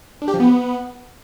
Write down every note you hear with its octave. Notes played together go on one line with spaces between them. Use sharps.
D4
G4
F3
B3